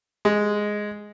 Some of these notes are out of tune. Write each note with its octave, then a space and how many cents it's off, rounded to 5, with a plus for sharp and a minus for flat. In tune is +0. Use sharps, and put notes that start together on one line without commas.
G#3 +0